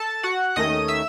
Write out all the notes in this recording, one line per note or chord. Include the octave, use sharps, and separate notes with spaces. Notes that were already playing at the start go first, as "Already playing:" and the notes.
Already playing: A4 A5
F#4 F#5
D#2 D#3 A3 C#4 D#5 D#6
E5 E6